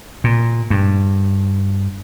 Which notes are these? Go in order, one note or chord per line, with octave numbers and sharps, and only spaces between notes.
A#2
G2